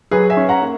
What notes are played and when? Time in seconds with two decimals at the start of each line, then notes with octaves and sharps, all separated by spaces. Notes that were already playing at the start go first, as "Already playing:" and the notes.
0.11 F#3 G#4 B4
0.30 E5 G#5
0.37 C#4
0.49 F#5 A#5
0.62 A#3